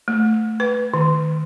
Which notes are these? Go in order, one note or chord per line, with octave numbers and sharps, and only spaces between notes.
A3
B4
D#3